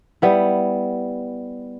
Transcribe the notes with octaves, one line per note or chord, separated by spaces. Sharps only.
G3 B3 E4